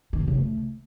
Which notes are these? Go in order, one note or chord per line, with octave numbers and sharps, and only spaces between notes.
D#3
B2
C#3
A3